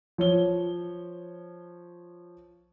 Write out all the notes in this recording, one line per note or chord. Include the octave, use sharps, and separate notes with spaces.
F3 C#5 G7